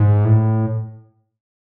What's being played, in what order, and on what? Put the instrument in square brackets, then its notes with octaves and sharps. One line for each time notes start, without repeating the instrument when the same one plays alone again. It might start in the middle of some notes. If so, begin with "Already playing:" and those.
Already playing: [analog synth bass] G#2
A2